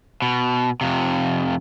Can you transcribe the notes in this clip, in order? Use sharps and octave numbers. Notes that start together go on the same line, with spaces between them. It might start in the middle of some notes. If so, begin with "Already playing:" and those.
B2
F2 C3